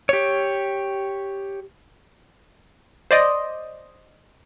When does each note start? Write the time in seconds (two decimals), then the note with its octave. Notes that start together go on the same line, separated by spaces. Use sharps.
0.09 G4 C#5
3.11 C5 D5 D#5